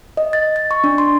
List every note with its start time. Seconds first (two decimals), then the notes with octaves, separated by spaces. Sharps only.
0.17 D#5
0.33 A6
0.56 A6
0.71 C#6
0.84 D4
0.98 C6